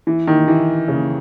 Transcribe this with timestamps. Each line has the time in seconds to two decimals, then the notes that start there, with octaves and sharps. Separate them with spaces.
0.07 E3
0.27 D#3
0.48 E3
0.88 C#3